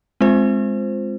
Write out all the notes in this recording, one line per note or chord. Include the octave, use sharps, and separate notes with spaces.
G#3 C4 F4 C5